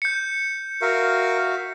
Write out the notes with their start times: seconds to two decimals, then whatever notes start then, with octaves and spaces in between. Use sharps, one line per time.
0.02 G6 C#7
0.81 F#4 A#4 E5 F5